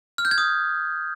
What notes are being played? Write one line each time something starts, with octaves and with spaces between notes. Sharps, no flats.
F6
G6
G#6
D#6